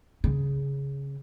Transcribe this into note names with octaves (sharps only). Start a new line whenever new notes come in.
C#3